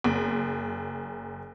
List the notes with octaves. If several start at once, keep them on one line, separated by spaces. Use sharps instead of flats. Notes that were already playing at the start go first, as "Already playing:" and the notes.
F#1